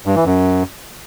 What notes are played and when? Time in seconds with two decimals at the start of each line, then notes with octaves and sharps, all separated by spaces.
0.06 G2
0.16 E3
0.26 F#2